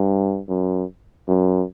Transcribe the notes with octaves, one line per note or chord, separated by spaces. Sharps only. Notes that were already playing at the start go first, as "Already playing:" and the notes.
Already playing: G2
F#2
F#2